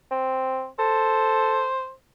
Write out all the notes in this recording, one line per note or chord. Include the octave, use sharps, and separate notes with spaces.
C4
A4 C5